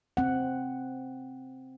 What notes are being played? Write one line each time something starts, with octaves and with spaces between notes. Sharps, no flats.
C4 F#5